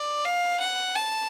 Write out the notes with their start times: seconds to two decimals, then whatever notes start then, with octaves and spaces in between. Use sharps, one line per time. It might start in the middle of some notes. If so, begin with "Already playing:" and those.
Already playing: D5
0.25 F5
0.60 F#5
0.96 A5